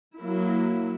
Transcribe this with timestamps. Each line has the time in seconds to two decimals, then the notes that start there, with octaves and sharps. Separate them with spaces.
0.17 F#3 A#3 E4